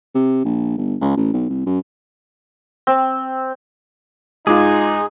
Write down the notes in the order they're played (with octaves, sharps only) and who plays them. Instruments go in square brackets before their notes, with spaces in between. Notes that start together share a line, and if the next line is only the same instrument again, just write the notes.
[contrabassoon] C3
A#1
G1
C#2
A1
B1
C2
F#2
[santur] C4
[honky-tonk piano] G#2 G#3 [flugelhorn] D#4 [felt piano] F4 D6 [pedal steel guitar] G#4